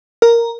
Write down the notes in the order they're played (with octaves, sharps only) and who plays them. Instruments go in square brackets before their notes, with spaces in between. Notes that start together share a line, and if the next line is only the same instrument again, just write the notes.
[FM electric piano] A#4